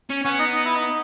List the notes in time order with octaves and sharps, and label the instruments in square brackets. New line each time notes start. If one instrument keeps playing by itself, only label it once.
[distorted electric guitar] C#4
[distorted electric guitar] B3 [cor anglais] C#4
[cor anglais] D#4
D#4
E4
D#4